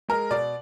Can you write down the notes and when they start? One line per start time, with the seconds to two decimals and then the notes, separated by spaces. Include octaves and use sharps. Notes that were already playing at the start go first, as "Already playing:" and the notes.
0.09 G#3 A#4
0.31 B2 D5